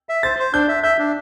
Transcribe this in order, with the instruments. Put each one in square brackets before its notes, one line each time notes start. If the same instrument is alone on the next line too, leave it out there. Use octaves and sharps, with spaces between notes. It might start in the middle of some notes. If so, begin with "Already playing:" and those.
[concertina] E5
[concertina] C5 [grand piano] A6
[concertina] C5
[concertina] D4 [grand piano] G6
[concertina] E5
[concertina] E5 [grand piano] G6
[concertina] D4